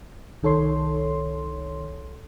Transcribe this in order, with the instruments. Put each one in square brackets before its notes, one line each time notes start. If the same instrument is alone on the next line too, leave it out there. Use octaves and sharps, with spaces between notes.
[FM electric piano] C2 D#3 A4 C#5 C6